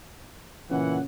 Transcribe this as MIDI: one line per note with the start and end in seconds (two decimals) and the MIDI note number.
0.71 0.99 46
0.71 1.04 49
0.71 0.99 52
0.71 0.99 78